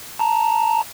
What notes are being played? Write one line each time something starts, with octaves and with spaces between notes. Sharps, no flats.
A5 A#5